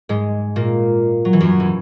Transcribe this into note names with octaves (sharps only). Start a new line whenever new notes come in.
G#2 G#3
A#2 A#3
F#3
E3
F#2 F#3
E3